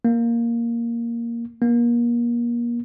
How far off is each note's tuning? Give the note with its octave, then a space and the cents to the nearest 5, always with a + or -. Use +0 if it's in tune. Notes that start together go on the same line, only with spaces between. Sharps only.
A#3 +0
A#3 +30